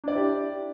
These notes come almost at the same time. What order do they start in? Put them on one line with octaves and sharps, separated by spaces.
D4 D5 E4 G4